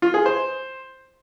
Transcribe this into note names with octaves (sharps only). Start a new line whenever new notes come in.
F4
G#4
C5